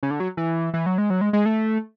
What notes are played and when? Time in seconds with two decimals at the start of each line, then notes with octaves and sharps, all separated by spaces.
0.03 C#3
0.11 D3
0.20 F#3
0.37 E3
0.74 E3
0.86 F#3
0.98 G#3
1.10 F#3
1.21 G#3
1.33 G#3
1.46 A3